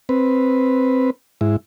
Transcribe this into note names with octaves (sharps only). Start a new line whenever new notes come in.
C4 B4
G#2 E4